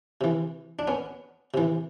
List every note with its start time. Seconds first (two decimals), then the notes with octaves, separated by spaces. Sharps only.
0.21 C3 E3
0.79 D4
0.87 B3 C#4
1.54 C3 E3